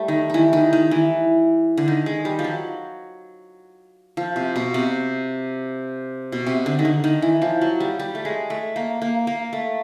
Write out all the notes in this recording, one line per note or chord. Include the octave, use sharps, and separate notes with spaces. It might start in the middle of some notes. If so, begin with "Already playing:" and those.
Already playing: G3 A3
D#3
D#3 E3
D#3
D#3
E3
D3
D#3
G#3
G3
F3
F#3
F3
C3
B2
C3
B2
C3
D3
D#3
D3
D#3
E3
F3
F#3
G3
G3
A3
G#3
A3
A#3
A#3
A#3
A3